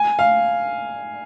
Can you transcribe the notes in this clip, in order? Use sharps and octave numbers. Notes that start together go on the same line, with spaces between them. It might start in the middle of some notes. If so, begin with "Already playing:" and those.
Already playing: G#5
F5